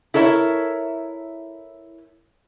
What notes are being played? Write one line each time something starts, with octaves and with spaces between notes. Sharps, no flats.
E4 A4 A#4 C#5 E5